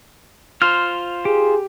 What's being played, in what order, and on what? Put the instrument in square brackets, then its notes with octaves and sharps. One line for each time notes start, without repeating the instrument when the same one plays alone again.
[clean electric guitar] F4 C5 [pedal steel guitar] F6
[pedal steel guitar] G4 [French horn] G#4